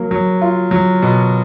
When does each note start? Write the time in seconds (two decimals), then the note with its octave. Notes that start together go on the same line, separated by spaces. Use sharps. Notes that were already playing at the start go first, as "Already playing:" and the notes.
Already playing: F#3 A#3
0.11 F#3
0.42 F4
0.71 F#3
1.02 B2